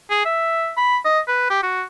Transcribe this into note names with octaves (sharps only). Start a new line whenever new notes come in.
G#4
E5
B5
D#5
B4
G4
F#4